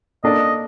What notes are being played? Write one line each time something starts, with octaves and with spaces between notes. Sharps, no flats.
A#3 D4 A4 D5 D#5